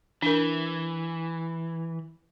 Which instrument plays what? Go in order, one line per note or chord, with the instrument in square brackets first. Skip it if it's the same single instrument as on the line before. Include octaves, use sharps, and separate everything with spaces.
[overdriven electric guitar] E3 [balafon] D4 A#4